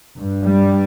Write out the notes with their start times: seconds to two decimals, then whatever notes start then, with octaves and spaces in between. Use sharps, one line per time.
0.17 G2
0.46 G3